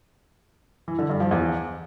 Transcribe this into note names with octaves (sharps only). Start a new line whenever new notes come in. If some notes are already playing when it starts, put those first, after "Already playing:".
E3
D3
G2
F3
E2